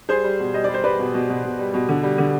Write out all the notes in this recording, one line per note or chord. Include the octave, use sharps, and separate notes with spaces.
G3 G#4 C5
G3
B2
G3 D#5
G3 D5
C5
G3 B4 D5
B2
B2
B2
B2
G3
B2
D3
G3
D3